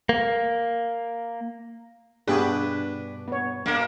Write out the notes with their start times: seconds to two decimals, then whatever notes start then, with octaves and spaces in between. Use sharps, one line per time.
0.09 A#3
2.27 G2 B2 B3 D4 G4 G#4 B4
3.28 B3 C#5
3.66 B2 A#3 D4 A#4 F5